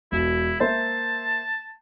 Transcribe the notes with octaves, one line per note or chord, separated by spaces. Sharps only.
E1 B2 E4
A#3 C5 E5 A5